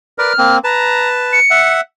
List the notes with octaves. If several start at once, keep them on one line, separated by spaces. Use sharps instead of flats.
A#4 B4 D5 F6
A#3 C4
B4 A5 A#5
C#7
E5 F#5